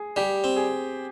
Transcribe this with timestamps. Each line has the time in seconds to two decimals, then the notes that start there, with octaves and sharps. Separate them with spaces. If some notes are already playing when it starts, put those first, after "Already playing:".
Already playing: G#4
0.16 G3 G4
0.44 C4
0.56 G#4